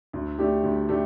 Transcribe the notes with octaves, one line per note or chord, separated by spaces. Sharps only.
D2
D3 A3 D4 G4
D2
D3 A3 D4 G4